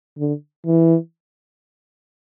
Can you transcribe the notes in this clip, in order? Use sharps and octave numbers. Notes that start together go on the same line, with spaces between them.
D3
E3